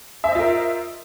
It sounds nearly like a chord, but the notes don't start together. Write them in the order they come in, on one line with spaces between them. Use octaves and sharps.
E5 C5 D#5 F4 A#4